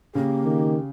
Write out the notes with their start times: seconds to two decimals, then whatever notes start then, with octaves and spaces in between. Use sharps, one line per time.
0.15 C#3 A#3 G4
0.45 D#3